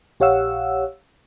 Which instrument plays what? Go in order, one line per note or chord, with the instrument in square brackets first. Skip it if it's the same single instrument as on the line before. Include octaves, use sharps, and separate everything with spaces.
[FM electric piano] A#1 G4 C#5 F5 F#5 E6